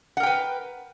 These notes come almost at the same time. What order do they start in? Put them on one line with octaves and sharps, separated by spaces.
F#5 A#4 G5 B4